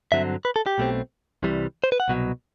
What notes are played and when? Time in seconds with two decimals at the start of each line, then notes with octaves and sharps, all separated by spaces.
0.12 G2 D3 F#3 C4 E5
0.45 B4
0.56 A4
0.66 G4
0.78 B1 B2 A3 C4
1.43 C2 C3 E3 G3
1.84 C5
1.92 B4
2.00 F#5
2.08 C2 B2 F#3